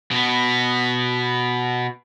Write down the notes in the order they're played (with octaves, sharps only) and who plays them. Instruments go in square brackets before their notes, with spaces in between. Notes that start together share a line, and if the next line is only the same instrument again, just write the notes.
[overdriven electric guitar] B2 B3